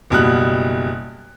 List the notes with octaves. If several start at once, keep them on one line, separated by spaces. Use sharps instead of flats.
F#1 B2 G3 F#6